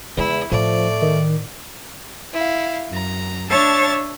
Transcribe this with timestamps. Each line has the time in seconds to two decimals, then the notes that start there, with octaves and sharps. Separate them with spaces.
0.17 E2 C#3 G#3 E4
0.52 A2 F3 A3 D5
1.02 D#3
2.33 E4 F5
2.89 F#2 A#5
3.49 D4 C#5 E5 A5 A6